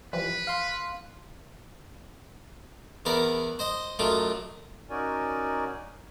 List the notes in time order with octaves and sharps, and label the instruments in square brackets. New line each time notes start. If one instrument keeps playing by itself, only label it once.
[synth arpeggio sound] E3 F3 G3 [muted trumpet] B4
[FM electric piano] F5 C6
[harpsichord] E2 B3 A#4 D5
C5 D#5 D#6
F#2 A3 D#4 F4 D6
[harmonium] C#4 D#4 F#4 A#4 D5 G#5